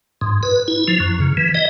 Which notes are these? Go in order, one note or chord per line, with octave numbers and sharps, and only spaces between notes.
G#2
B4
E4
F3
F#2
C#3
E3
D#5